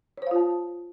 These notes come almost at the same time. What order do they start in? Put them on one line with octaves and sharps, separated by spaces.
C#5 C5 F5 F4 A5